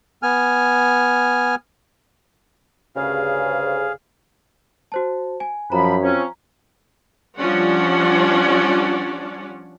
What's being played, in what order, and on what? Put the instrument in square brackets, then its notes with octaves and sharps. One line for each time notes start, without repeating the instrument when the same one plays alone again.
[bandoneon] B3 G#5 F6
[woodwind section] D2 G2 C#3 [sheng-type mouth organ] G#4 F5
[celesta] F#4 C5 A5
G#5
[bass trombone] F#2 [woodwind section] F3 B5 [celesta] A#5
[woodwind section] F3 C4 C#4
[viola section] F3 G3 C#4 D4 D5 F#5